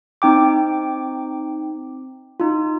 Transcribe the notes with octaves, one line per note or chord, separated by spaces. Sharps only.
C4 D#4 G5 D6
D#4 F4